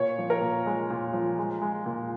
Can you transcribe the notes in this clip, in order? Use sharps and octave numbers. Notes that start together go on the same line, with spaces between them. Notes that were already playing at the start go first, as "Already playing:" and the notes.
Already playing: A#2 C#5
F3
A#4
A#2
G#3
A#2
F3
G#3
G#3
A#2